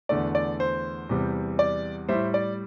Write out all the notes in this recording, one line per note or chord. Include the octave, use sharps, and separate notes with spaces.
E2 D3 A3 D5
D5
C5
E2 C3 G3
D5
A2 G3 C5 E5
D5